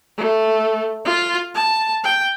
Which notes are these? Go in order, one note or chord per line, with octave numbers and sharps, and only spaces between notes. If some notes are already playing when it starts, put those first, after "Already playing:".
A3
F4
A5
G5